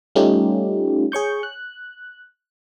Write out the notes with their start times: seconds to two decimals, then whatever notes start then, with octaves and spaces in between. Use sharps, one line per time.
0.15 G3 A3 C#4 D#4 F4 G4
1.12 G#4 C#5 C#6 G6
1.43 F#6